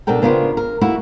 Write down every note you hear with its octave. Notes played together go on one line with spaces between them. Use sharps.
B2 D4 A4 A#4 G5
C#3 B3 D4 F4 A#4 C5
A#4
A3 A#3 E4 F#4